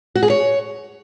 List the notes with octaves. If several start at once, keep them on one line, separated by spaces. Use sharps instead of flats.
F#4
G#4
C#5